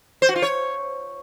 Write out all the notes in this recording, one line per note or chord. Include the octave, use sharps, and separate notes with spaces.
C5
F#4
F4
C#5